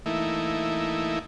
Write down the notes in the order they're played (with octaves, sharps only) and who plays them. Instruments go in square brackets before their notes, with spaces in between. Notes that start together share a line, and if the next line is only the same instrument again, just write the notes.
[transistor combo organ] E3 A3 A#3 D#4 E4